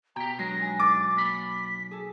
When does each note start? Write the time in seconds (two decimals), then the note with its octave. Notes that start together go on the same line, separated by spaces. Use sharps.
0.16 B2 G4 G5 A#5
0.39 F#3 G#3 D4 A#6
0.59 D#4 G#5
0.80 D6 A6
1.17 A#3 B5 B6
1.91 G#4 A4